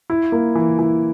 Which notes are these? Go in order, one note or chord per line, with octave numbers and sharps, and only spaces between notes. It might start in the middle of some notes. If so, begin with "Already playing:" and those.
E4
A#3
E3
E3